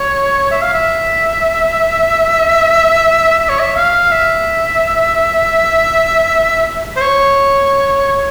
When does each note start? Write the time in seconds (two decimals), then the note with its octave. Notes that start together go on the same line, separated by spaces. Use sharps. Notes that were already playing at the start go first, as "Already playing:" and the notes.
Already playing: C#5
0.51 E5
0.62 F5
0.74 E5
3.40 E5
3.49 C#5
3.60 E5
3.76 F5
4.12 E5
6.96 C5
7.01 C#5